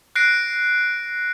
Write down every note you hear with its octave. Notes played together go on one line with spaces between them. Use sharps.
F#6 A#6 C7 D7